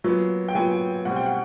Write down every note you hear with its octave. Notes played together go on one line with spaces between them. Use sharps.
A#2 F#3 B3
G5
A#2 F#3 B3 G#5
B2 G3 C4 F#5
G5
F#5